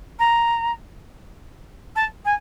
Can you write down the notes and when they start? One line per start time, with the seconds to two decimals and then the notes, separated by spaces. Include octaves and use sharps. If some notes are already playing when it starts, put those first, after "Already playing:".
0.19 A#5
1.96 A5
2.25 G#5